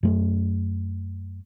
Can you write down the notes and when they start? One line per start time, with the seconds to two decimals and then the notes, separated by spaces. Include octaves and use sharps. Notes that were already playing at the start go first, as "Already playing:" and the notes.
0.03 F#2 A3